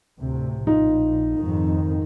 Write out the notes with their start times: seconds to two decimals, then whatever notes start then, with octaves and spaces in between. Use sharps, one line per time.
0.21 D2 A2 C3
0.67 A#1 D#4 F4
1.36 F2 G#2 D#3